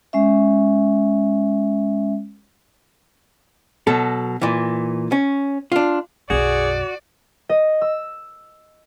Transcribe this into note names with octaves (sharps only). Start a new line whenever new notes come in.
G#3 C#4 E5
B2 F#3 A4
A#2 E3
C#4
D4 F4
B1 F#2 F#4 G#4 D5
D#5
E6